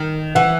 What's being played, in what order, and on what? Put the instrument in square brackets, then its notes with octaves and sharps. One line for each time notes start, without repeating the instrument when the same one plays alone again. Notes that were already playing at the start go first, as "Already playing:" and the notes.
Already playing: [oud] D#3
[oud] E3 [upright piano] F#5